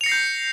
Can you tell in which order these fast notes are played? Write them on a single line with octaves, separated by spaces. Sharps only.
F7 C#7 A#6 C7 G6